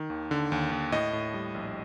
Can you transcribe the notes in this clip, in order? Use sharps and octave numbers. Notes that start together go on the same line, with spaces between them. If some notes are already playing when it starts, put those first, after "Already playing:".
Already playing: D#3
D#2
D3
D#2
D#2
A2 D#5
A2
G3
A#1